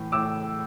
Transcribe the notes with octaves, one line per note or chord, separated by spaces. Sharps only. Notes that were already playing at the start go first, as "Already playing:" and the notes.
Already playing: A2 E3
A2 D6 E6